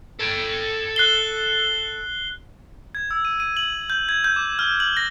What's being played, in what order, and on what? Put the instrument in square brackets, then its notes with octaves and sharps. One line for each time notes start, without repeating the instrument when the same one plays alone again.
[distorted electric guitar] A4 G5
[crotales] F#6 C7 G7
G#6
E6
D#7
D#7
F#7
G6
G#6
G6
D6
F6
F#7
A#6